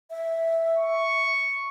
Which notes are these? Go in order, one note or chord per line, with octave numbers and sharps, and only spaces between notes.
E5
C#6